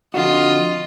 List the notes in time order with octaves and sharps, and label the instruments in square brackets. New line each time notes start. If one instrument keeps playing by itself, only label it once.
[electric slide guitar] F2 D3 F#4 [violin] F4 D#5